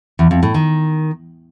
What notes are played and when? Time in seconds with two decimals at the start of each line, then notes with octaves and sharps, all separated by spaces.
0.19 E2
0.31 F2
0.43 A2
0.54 D#3